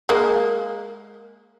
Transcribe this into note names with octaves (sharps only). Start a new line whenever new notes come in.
G#3 A#3